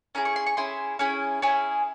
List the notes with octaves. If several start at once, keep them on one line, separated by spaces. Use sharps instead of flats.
C#4 E4 G#4 A#5
C#6
C6
C#6
C#4 E4 G#4 C6
C#4 E4 G#4 B5
C#4 E4 G#4